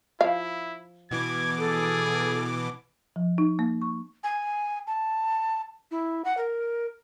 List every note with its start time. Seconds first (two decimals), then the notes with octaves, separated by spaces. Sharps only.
0.21 F3 E4 F5
1.11 B2 E3 D6 G#6
1.58 G#4 A4
3.16 F3
3.38 D#4
3.59 A#3
3.82 C#6
4.24 G#5
4.87 A5
5.91 E4
6.25 F#5
6.38 A#4